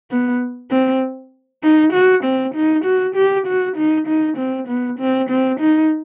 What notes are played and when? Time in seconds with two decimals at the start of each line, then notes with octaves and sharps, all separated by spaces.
0.11 B3
0.71 C4
1.63 D#4
1.93 F#4
2.24 C4
2.55 D#4
2.85 F#4
3.16 G4
3.47 F#4
3.77 D#4
4.08 D#4
4.38 C4
4.68 B3
5.00 C4
5.30 C4
5.60 D#4